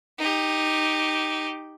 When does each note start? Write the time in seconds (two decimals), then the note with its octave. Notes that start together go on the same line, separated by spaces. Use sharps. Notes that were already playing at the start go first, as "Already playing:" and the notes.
0.18 D#4 G4